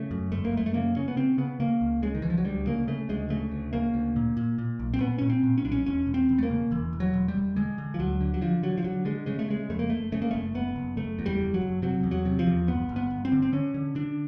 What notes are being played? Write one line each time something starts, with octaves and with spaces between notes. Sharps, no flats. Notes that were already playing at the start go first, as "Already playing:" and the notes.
Already playing: C#3 A3
F#2
G1 A3
A#3
F#2 A3
A3
C#3 A#3
C#3 C#4
B3
C#3 C4
C#3 B3
C#3 A#3
C#2
C#3 G#3
D#3
C#2 E3
F3
F#3
D2 G3
C#3 A#3
C#3 A3
D2 G#3
C#3 A3
D2
C#3 A#3
D2
A#2
A#2
A#2
B1
C4
A#2 B3
A#2 C#4
C4
A#2
C#4
B1 D4
C#4
E1 C#4
E1
C4
E1
A3
A#3
C#3
E1 E3
E1
F#3
E1
G3
E1
D3 G#3
D3
F3
D2 F#3
D3
F#3
D3 F3
D3 F#3
F3
D3 F#3
D3 G#3
C#3 G#3
A3
C#3 G#3
F2 A3
A#3
F#1 A3
C#3 A3
A#3
F#1 A3
F#1 B3
F#1
F#1 A3
E2
G3
F#1
F#3
F#1
C3 F#3
E2
F#3
C3
F3
E2
G1 B3
G1
B3
G1
C4
D3
C4
D3 C#4
D3
D3 D4